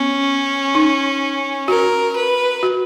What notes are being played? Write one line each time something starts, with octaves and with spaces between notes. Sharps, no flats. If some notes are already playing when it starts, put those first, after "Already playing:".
Already playing: B3 C#4
D#4
F#4 A#4
B4
F#4